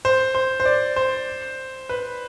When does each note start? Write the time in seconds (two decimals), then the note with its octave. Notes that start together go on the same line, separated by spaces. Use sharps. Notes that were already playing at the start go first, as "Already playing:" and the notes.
0.05 C5
0.35 C5
0.60 C5
0.65 D5
0.96 C5
1.89 B4